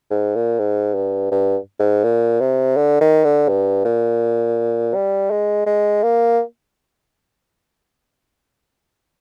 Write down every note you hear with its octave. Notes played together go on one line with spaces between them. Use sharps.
G#2
A#2
G#2
G2
G2
G#2
A#2
C3
D3
D#3
D3
G2
A#2
G3
G#3
G#3
A#3